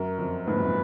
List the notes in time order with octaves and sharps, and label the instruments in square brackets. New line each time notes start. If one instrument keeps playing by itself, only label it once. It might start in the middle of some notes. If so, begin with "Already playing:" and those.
Already playing: [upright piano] F#2 [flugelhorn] A#4
[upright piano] F2
[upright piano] F2 G#2 [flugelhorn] B4
[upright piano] F#2 A#2
A#2